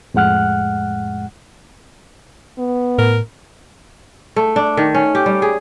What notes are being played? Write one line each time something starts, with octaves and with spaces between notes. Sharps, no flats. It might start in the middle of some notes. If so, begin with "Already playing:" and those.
F2 A2 G#3 F#5 F6 F#6
B3
A2 A#4
A3
D4
D#3
C#4
G4
G3
G#4